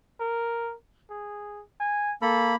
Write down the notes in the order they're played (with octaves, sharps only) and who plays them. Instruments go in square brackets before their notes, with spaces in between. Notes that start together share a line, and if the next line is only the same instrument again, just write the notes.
[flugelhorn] A#4
G#4
G#5
[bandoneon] A#3 B5 [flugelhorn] A4